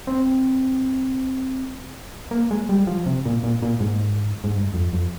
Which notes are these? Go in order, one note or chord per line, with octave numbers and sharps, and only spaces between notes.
C4
A#3
G#3
G3
F3
C3
A#2
A#2
A#2
G#2
G#2
G2
F2
F2